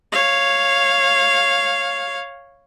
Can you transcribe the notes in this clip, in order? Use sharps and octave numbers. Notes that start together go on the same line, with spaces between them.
C#5 F5